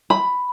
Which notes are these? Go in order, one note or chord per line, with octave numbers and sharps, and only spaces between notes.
B5